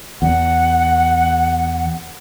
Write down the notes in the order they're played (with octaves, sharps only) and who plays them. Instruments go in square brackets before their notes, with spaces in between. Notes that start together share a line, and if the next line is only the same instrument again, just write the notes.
[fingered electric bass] E2 [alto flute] F#5